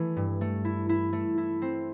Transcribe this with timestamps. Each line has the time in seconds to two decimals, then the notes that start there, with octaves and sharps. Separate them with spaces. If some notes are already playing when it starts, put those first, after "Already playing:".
Already playing: E3 A3 E4
0.16 G2
0.41 A3
0.65 E4
0.89 E4
1.13 A3
1.38 E4
1.62 C4